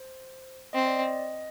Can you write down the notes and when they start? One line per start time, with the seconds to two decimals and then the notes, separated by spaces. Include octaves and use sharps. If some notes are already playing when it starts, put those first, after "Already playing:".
Already playing: C5
0.73 C4 D#5
0.86 D5
0.97 D#5